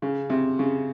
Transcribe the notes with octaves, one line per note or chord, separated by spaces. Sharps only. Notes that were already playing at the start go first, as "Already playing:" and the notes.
C#3
C3
C#3